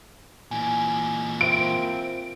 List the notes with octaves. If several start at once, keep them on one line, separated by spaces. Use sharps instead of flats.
A#2 E3 G#5
A#3 C4 F4 E5 D7